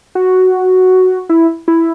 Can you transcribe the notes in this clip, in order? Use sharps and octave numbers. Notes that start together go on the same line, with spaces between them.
F#4
E4
E4